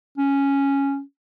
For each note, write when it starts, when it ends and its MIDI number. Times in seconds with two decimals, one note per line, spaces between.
0.18 1.01 61